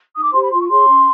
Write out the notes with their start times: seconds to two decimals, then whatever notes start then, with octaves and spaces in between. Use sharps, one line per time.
0.14 D#4 D#6
0.23 D6
0.32 G4 C5 C6
0.41 B5
0.50 F4 C6
0.61 C#6
0.68 G#4 C#5 C6
0.87 C#4